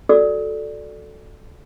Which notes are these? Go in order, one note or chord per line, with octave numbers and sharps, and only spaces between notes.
F#4 A4 D5 E6